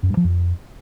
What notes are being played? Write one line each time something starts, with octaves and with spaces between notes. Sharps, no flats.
F#2
G2
F3
F2